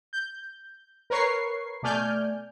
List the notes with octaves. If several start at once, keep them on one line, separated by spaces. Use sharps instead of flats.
G6
A#4 B4 C#5 C#6 C7
B2 A3 D5 G#5 F6 G6